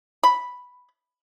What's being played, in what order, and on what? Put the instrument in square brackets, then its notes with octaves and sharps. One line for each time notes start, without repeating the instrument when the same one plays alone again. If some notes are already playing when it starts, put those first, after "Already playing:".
[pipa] B5